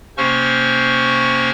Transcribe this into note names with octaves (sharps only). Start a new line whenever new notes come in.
C3 A#3 C#4 C5 C#6 F6